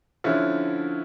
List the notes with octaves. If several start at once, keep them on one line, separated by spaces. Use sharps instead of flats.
D3 F3 C#4 E4